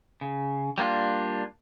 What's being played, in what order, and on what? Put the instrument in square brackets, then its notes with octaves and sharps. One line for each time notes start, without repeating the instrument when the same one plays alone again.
[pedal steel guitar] C#3
G3 A#3 D4 F4